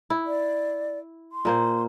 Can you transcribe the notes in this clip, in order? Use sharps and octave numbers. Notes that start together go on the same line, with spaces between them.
E4
D5
C6
A#2 A#3 C5